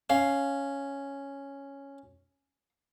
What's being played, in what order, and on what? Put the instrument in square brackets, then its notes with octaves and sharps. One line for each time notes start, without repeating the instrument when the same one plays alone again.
[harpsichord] C#4 [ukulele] F5